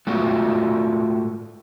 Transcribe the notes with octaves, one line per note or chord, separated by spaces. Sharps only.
A2 G#3 A3 F4 F#4 A4